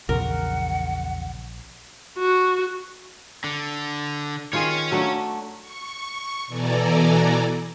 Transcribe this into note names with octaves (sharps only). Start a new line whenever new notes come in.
A#1 E2 C#3 A#4 F#5
F#4
D3
D#3 F4 G#4 C#5 G#5
F#3 A3 D4
C#6
B2 E3 A4 D5 G#5 A#5